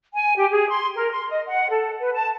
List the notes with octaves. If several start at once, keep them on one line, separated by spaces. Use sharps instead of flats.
G#5
G4
G#4
C6
A#4
C6
D#5
F#5
A4
B4
A5